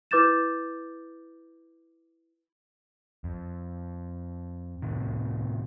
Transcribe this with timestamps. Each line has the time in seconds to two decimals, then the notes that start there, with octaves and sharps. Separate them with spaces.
0.11 E4 B4 D6 G6 A6 E7
3.24 F2
4.82 A2 C3 D#3